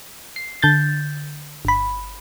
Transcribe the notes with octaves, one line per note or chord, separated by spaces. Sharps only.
C7
D3 G6 A6
G1 B5